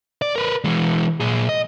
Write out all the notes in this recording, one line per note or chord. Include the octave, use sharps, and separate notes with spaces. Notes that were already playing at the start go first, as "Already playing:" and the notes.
D5
A#4 B4
E3 G#3
A#2 G#4
D#5